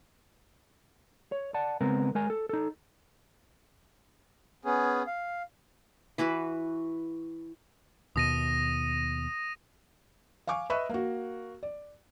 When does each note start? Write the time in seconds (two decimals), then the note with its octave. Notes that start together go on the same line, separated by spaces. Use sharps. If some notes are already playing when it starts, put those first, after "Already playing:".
1.32 C#5
1.54 D5 F#5 A5
1.81 C#3 G#3 B3 C4 A#4
2.15 G#3 A#4 G#5
2.30 A4
2.49 D#4 A4
4.65 B3 C#4 G#4
5.07 F5
6.18 E3 E4 F#4 B4
8.16 D#2 B2 D#6 A#6 D#7
10.47 F5 G#5 C#6 D6
10.70 B4 D#5 E5 B5 C#6 F#6
10.90 A#3 F#4
11.63 D5